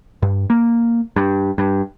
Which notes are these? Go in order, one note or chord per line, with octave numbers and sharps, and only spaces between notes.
G2
A#3
G2
G2